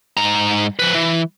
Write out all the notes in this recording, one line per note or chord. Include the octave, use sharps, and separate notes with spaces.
G#2 A#5
F3 B4
E3